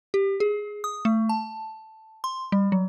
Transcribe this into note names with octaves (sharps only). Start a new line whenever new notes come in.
G4
G#4
D#6
A3
A5
C6
G3
F#3